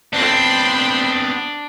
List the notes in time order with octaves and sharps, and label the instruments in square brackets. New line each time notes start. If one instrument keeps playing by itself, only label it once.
[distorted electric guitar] B3 C4 [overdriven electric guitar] D4 [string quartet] G5 B5 C6